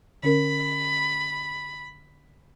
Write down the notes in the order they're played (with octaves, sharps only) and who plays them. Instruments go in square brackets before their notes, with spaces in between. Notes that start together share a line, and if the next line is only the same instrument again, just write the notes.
[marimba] D3 C#4 A#4 [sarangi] B5